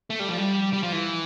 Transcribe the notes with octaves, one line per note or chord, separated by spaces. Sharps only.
A3
G3
F3
G3
G3
F3
E3